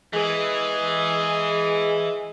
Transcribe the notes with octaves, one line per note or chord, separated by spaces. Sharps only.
E3 G#3 G#4